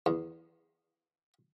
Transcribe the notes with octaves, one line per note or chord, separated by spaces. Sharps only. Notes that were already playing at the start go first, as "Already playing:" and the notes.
E2